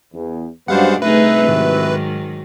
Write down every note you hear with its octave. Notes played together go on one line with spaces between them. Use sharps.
E2
F#2 G3 G#3 B3 D4 C5 F5 F#5
C2 A3 D#4 G#4 B4 E5
G#2 D#3 F#3